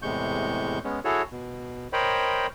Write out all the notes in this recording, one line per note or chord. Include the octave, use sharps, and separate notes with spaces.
E2 A2 C3 G#3 C#6 G6
G#3 B3 C#4
E4 F#4 G#4 A4 C#5
B2
A#4 C5 C#5 D#5 G5 B5